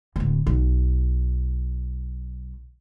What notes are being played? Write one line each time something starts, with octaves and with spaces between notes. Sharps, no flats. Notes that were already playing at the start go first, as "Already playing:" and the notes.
D1 D2
B1